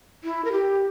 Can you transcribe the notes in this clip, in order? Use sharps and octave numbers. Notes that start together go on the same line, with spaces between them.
E4
A#4
G4